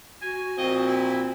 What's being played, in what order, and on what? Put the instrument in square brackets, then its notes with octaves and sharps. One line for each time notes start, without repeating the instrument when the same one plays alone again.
[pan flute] F#4 [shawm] G#5
[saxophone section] A#2 F3 C4 [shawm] D#5
[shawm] E4